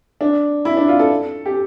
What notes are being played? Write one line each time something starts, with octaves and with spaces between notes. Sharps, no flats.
D4
E4
D4
F4
A4
G4